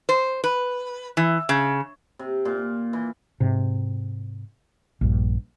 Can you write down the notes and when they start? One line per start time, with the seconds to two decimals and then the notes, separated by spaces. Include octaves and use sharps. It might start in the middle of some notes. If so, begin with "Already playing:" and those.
0.09 C5
0.44 B4
1.17 E3
1.49 C#3
2.19 C3
2.45 A#2
2.93 E3
3.40 G#2 C3
5.01 A#1 G2